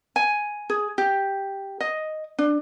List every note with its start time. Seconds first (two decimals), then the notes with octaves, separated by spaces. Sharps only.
0.16 G#5
0.70 G#4
0.98 G4
1.81 D#5
2.39 D4